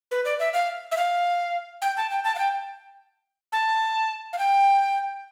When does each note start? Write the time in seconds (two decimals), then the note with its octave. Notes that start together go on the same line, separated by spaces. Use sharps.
0.11 B4
0.25 D5
0.39 E5
0.53 F5
0.91 E5
0.97 F5
1.82 G5
1.97 A5
2.10 G5
2.24 A5
2.35 F5
2.39 G5
3.52 A5
4.33 F5
4.38 G5